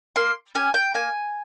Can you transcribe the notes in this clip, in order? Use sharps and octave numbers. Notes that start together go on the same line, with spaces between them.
A#3 C6
C#4 G4 G#5
G5
A#3 G#5